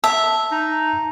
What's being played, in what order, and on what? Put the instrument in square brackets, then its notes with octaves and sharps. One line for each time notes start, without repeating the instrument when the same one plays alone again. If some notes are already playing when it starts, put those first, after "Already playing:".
[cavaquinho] E5 [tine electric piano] A5
[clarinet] D#4